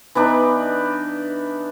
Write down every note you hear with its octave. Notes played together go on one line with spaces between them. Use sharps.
E3 B3 D4 D#4